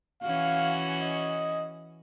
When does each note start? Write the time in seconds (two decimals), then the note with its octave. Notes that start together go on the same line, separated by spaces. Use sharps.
0.23 E3 C#4 F#4 F5
1.01 D#5